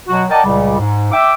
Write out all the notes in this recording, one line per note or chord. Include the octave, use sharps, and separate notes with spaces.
B2 F#3 F#4
A#4 D5 D#5 F#5 G5 A5
C#2 A#2 C#3 G3
G#2
E5 G5 D6